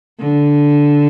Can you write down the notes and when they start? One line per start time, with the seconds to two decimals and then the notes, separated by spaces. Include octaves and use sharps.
0.20 D3